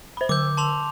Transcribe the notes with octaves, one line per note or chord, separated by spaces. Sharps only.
C5 B5
D3 D6 E6 G6
A5 C6 F7